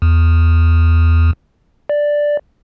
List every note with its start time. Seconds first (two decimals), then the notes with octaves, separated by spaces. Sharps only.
0.02 E2
1.89 D5